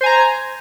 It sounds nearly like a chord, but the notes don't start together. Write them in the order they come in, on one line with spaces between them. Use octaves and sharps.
C5 G#5 A#5